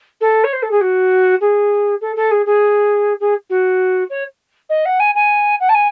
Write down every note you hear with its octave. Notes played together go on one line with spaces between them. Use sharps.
A4
C#5
C5
A4
G#4
F#4
G#4
A4
A4
G#4
G#4
G#4
F#4
C#5
D#5
F#5
G#5
G#5
F#5
A5
G#5